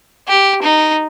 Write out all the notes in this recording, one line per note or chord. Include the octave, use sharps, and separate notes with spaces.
G4
D#4